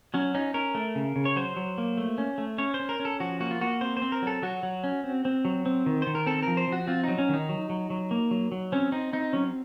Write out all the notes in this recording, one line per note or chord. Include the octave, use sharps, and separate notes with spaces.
F#3 C#4
C#4 D#4
C#4 A#4
A3
C#3
C#3
C#5
F#3 C5
F#3
A#3
A3
C#4
A3
C#4 C#5
C5
C#4
A#4
C#4
A4
F3 F#4
A#3 F#4
F4
A#3 F#4
C4 C5
C5
C4
A#4
F#3 A4
F#3 F#4
F#3
C#4
C4
C4
F#3
C4
D#3
D#3 C5
A#4
C4 A4
F3 A#4
C5
F3 F#4
C4 F4
F#3 D#4
C#4
D#3 D#4
F#3
F#3
F#3
A#3
F#3
F#3
C4 C#4
C4 D#4
C4 D#4
F#3 C#4